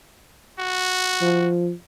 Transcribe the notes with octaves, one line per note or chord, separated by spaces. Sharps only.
F#4
F3